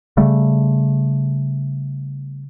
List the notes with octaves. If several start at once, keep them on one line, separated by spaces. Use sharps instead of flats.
C#3 G3 A3